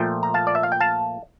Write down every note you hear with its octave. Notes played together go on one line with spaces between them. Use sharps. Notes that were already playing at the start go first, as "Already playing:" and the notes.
Already playing: A#2 F3 A3 G5
A#5
F5 A5
D5
E5
F5
G5
F5 A5